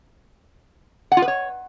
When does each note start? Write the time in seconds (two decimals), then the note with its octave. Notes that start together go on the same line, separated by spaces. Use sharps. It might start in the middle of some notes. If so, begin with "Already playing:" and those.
1.12 F#5
1.17 F4
1.22 B4
1.28 C#5